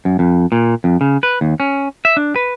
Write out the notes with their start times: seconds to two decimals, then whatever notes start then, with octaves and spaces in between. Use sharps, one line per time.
0.05 F#2
0.19 F2
0.52 A#2
0.84 F2
1.01 C#3
1.23 B4
1.41 D#2
1.60 C#4
2.05 E5
2.17 D4
2.36 B4